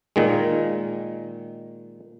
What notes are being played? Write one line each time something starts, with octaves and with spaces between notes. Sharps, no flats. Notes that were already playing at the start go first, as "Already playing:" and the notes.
A#2 D#3 G#3